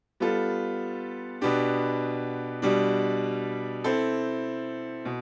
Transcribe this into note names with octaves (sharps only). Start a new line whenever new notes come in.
G3 B3 F4 A4
B2 B3 D4 G4
B2 G3 D4
C4 E4 A4
B2